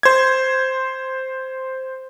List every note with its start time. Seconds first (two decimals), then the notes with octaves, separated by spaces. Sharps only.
0.03 C5 G#6